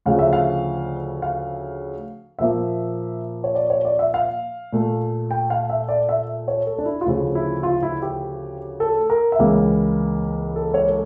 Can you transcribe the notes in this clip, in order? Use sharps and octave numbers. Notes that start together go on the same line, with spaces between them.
D2 C#3 F3 F5
E5
F5
F5
A#2 F3 A#3 E5
C#5
D5
C#5
D5
E5
F5
A#2 A3
G5
F5
E5
D5
E5
C#5
A4
D4
E4
F4
D2 C#3 F3 E4
E4
F4
E4
G4
A4
A#4
E5
C#2 C#3 E3 A#3 F5
A4
C#5
A4